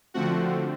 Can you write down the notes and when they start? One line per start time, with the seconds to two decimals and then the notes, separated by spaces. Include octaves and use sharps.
0.14 D3 F3 A3 C4 F#4 F#5